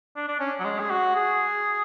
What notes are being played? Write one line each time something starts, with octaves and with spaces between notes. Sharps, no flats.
D4
D4
C#4
F#3
G#3
G#4
F#4
G#4